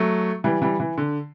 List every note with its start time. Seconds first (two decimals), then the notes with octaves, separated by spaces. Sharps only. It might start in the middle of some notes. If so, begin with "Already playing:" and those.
Already playing: F#3 A3
0.44 E3 G3
0.62 E3 G3
0.80 E3
0.98 D3